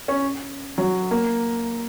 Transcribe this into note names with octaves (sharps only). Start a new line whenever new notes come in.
C#4
F#3
A#3